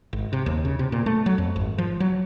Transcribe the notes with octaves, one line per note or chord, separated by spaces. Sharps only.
G#1
C3
D#2
C#3
C3
A#2
A3
F#3
F2
G#1
F3
F#3